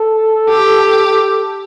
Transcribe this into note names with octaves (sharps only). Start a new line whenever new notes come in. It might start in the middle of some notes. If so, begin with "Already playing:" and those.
Already playing: A4
G4